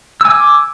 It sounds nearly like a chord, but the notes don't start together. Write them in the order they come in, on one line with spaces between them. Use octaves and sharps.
E6 G#5 D6